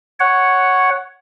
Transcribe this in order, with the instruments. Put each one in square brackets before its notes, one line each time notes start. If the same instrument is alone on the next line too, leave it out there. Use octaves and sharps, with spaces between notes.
[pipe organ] C#5 F#5